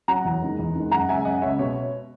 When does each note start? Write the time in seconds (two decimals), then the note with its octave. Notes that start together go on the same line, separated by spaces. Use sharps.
0.08 F#3 F#5 A#5
0.25 E2
0.42 D#3 G#3
0.59 E2
0.75 D#3 G#3
0.91 F#2 F#5 A#5
1.08 C#3 G#3 E5 G#5
1.25 F#2 D#5 F#5
1.42 C#3 G#3 C#5 E5
1.58 B2 C#5